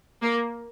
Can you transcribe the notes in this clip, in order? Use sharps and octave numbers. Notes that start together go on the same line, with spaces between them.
A#3